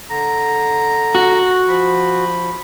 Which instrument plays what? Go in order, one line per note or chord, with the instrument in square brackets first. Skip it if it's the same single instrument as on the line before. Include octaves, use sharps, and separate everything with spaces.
[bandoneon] D3 A#5
[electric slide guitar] F#4
[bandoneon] F3 B5